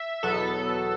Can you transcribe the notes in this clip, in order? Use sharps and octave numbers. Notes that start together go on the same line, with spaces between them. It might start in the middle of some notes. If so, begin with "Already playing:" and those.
Already playing: E5
E2 B2 F#3 B3 A4